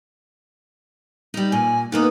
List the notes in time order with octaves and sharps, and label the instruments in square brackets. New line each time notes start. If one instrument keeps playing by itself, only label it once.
[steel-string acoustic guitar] G3 D#4
[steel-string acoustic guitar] A#2 [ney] G#5
[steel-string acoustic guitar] D3 A#3 B3 [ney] D#4